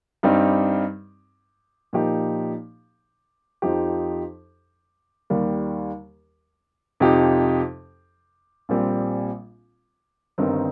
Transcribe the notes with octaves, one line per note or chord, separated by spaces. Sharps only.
G2 G3 C4 D#4 G4
A#2 F3 D#4 G4
F2 F3 D#4 G4
D#2 D#3 G3
F2 C3 F3 D#4 G4
A#1 A#2 G3 C4
G1 G2 D#3 C4 D#4